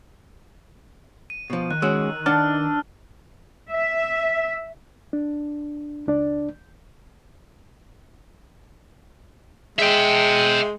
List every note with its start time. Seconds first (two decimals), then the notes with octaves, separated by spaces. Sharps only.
1.30 D#7
1.50 B2 F3
1.71 D#3 F#6
1.82 G#3 C#4 F#4 E6
2.26 D4 D5 F#5 A5 F6
3.71 E5
5.13 D4
6.07 C#2 D4 D5
9.79 G#3 E5 G5